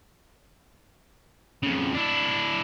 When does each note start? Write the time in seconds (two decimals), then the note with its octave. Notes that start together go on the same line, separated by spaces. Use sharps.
1.63 F2 C#3
1.94 D4 E4